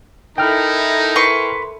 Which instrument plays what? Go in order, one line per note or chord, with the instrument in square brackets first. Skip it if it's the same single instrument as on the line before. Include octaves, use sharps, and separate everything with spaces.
[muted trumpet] D#4 [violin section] E4 A4 A#4 [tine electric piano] G5 F6
[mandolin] B4 C6 C#6